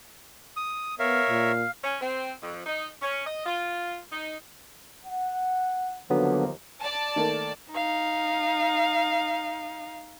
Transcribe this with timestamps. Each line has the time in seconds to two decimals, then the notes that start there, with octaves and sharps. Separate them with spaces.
0.56 D#6
0.99 B3 A#4 C#5 E5 F5
1.30 A#2
1.84 C#4
2.01 C4
2.43 F2
2.66 D#4
3.02 C#4
3.27 D#5
3.46 F4
4.12 D#4
5.06 F#5
6.10 D#2 D3 F3 F#3 A#3 B3
6.81 D5 A5
7.16 D#3 A3 A#3
7.72 D#4 F5